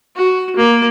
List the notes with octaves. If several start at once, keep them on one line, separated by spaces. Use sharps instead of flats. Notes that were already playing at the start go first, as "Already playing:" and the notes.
F#4
A#3